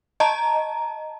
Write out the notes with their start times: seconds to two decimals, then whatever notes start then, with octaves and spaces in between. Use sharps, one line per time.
0.20 D#5 A5 A#5